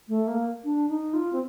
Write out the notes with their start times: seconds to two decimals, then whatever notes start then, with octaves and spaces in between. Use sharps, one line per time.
0.08 A3
0.27 A#3
0.64 D4
0.89 D#4
1.14 F4
1.33 C4